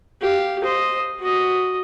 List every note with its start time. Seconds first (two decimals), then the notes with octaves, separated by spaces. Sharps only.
0.22 G4 F5
0.63 C5 D#5
1.20 F#4 D#5